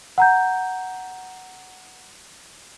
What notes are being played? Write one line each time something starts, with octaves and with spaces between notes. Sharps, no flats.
F#5 A#5 G6